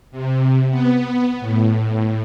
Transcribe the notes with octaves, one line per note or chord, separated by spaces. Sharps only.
C3
B3
A2